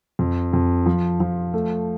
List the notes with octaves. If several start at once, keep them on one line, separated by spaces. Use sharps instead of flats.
F2
F2
F3
F3
A3